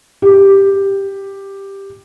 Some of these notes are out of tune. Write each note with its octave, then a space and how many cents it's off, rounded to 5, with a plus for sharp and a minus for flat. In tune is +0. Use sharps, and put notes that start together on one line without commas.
G4 +5